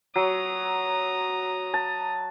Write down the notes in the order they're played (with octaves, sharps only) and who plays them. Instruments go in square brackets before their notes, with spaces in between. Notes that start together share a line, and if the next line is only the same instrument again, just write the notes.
[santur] F#3 [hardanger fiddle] A#5 D#6
[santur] A5